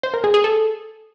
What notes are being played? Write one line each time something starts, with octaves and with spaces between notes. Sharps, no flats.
C5
A#4
G#4
G#4
A4